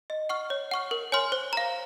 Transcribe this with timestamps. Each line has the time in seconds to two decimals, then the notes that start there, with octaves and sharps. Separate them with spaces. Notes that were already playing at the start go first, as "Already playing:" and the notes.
0.10 D#5
0.29 F#5 C#6 F6
0.50 C#5
0.71 F#5 C#6 F6
0.91 A#4
1.12 C#5 G#5 C6 F6
1.32 C5
1.53 F5 A#5